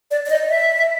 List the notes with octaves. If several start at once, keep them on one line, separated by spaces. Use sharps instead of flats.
D5
D5
D#5
E5